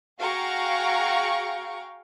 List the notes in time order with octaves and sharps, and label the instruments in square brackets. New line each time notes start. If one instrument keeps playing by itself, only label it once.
[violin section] F#4 G#4 F5 G5 A#5 C#6